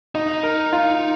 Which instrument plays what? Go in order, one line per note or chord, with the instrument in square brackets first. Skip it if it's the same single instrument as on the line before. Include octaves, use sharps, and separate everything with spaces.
[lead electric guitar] D#4 [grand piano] D#5
[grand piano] A#4
F4